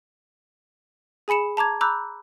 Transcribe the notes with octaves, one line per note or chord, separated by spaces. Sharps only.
G#4 G#5 B5 C#7 E7
A5 A#5 D6 G#6
A#5 B5 D6 E6 F#6 G6